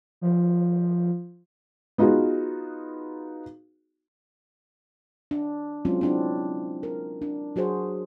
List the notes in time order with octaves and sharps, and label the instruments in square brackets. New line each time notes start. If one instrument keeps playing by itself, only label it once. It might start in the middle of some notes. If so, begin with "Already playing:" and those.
[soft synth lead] F3
[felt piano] B3 D#4 F4 F#4 G#4
[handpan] D4
F#3 G#3 C4 C#4 F4
C4 D4 E4
A#4
D4
F#3 F#4 G#4 C5